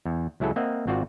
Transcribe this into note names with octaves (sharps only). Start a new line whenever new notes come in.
E2
C#2 F#3 E4 G#4 A4
A#3 C4 D#5 E5 F#5
G#1 C4 F4 F#4 C5 D5